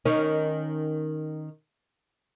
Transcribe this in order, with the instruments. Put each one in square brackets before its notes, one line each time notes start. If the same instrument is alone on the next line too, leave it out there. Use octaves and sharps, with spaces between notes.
[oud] D#3 C#4